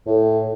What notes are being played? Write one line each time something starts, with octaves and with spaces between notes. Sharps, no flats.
A2